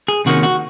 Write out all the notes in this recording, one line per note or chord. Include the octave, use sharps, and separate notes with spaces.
G#4
C3 D#3 A#3 C#4 F#4
F#4